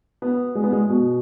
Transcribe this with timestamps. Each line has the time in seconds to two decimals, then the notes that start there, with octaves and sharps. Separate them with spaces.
0.22 B3
0.55 G#3
0.64 B3
0.72 G#3
0.89 B2